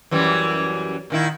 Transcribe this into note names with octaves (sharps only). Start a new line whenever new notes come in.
F#2 E3 G3
A#2 D#3 E4